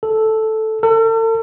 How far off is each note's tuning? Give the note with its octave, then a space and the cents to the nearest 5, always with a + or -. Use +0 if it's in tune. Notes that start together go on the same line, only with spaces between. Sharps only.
A4 -5
A4 +40